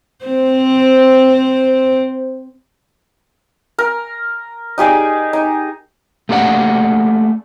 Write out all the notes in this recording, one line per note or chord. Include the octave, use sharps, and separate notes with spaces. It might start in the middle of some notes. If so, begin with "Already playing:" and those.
C4 C5
A#4
D#4 G4 G#4 D5
D#4
A3 A#3 G4 D5 F#5